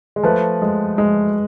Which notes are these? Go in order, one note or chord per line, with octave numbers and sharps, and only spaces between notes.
G#3
F3 A3 B4
G#3
G#3